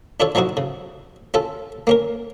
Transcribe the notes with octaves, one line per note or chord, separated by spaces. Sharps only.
D4 F4 A4 C#5
F3 F#3 D#4 E4 F#4
C#3
C#4 F4 A4
A#3 C#4 A#4